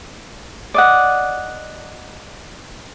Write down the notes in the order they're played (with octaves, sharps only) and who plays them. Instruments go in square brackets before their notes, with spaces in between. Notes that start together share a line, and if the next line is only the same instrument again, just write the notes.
[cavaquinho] D5 D#5 F#5